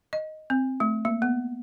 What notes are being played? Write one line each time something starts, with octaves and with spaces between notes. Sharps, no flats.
D#5
C4
A3
A#3
B3